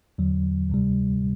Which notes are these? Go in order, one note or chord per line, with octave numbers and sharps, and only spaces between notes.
E2 D3 F#3
D2 C3 G3